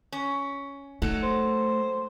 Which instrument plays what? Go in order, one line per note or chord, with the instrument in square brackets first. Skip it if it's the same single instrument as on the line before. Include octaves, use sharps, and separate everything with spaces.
[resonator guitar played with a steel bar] C#4
[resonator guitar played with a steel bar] F#3 D#4 A4 [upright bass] A3
[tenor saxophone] C5